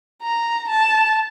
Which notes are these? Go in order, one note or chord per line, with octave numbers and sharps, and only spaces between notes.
A#5
A5